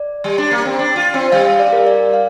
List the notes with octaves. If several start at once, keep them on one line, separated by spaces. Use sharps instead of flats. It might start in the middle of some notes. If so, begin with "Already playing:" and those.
Already playing: D5
G3
D4
A#3
C4
D4
F4
C4
G3 F5
F5
D5
A#4
D5
F5